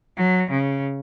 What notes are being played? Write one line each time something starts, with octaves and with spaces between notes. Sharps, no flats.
F#3
C#3